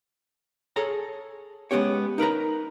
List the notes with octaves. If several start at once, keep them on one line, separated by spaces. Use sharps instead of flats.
G#4 A4 C#5 A#5
G#3 A3 B3 C#4 G4 C#5
D#4 A#4 B4 A#5